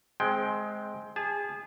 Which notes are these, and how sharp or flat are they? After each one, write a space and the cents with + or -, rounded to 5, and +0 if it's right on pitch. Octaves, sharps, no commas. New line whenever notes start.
G#3 +15 C4 +0 G5 +0
G#4 -30 A5 -35